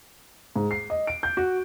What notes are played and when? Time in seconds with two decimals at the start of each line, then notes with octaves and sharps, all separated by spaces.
0.56 G#2
0.71 C7
0.90 D#5
1.07 D7
1.23 G6
1.37 F#4